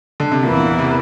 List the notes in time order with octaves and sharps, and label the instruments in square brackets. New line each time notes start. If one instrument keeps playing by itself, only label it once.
[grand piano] D3
C3
[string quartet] E2 E3 A#3 E4 [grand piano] A#2
[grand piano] C3